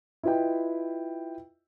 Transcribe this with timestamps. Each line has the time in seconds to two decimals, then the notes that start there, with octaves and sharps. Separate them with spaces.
0.23 E4 F4 B4 D#5 G5